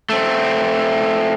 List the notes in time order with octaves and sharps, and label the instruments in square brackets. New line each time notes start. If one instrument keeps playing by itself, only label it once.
[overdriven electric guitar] A3 C4